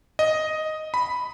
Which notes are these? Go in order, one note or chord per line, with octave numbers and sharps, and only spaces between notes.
D#5
B5